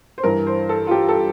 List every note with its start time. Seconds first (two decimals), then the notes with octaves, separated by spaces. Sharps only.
0.18 C5
0.23 G2 E3 A#4
0.47 C5
0.69 A4
0.87 F4
0.91 G4
1.09 A4